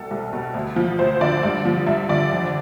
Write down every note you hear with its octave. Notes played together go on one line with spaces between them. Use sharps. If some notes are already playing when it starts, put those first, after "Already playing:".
Already playing: C2 B2 A4
C2
B2
D2
F3
D2 C5
D3 D5
G2 D5
F3
G2 E5
D3 D5
F2